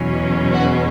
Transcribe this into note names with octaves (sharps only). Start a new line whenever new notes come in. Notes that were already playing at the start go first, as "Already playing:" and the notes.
Already playing: E2 B2 F#3 C#4
F#4